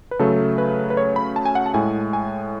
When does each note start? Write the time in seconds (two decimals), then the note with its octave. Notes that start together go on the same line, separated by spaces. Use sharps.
0.11 B4
0.19 C#3 F#3 A3 A4
0.58 B4
0.90 B4
0.97 C#5
1.16 B5
1.36 A5
1.45 G#5
1.55 F#5
1.66 A5
1.74 A2 G#3 G#5
2.13 G#5